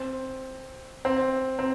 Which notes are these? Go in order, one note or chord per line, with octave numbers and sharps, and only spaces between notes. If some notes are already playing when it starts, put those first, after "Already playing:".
Already playing: C4
C4
C4